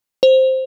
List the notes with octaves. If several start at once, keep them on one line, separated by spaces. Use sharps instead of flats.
C5